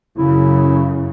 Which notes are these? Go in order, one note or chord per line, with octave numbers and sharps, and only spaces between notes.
F#2 C#3 E4